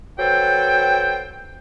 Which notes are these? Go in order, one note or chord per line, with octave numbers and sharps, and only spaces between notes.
F#3 A4 B4 C5 G5